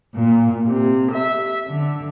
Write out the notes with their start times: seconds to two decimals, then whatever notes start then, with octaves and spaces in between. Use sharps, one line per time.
0.14 A#2
0.66 C3
1.11 E5
1.68 D3